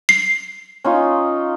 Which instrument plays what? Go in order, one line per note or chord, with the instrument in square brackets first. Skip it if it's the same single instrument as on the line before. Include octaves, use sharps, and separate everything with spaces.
[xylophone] C7
[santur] C#4 D#4 F4